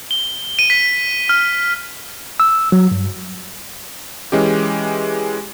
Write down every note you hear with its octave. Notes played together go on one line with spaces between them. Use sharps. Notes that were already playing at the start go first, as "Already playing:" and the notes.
G7
D#7
B6
F6
E6
F#3
G2
E3 G#3 C#4 G4